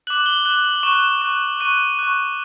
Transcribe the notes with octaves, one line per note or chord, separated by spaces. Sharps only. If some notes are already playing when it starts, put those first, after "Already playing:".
D6 F#6 F#7
F#7
G7
D6 F#6 F#7
F#7
C#6 F#6 E7
C#6 F#6
C#6 F#6 D#7
C#6 F#6